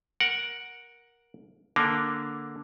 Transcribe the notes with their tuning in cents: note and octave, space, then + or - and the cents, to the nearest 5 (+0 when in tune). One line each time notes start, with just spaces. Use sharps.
A#4 +10 F#5 -5
D3 +0 A#3 +0 D4 +0